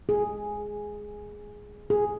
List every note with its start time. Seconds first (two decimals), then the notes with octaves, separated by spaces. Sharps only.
0.09 G#4
1.90 G#4